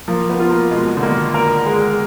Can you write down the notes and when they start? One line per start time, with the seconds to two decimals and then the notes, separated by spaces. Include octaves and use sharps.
0.08 F3 A#3
0.30 B3
0.40 F4
0.50 A#3
0.71 B2 G#3
0.97 D3
1.03 D#3 A#3
1.34 A#4
1.66 G#3